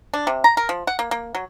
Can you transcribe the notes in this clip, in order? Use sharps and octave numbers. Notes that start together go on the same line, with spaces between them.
D4
C3
A#5
A#4
F3
F#5
A#3
A#3
F#3